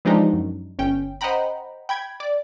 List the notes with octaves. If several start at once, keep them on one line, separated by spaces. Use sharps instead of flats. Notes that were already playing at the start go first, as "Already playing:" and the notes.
E3 F3 G#3 D4 D#4 G4
F#2
G1 C#4 G5
C5 D#5 F#5 G5 A#5 B5
G5 B5 G#6
D5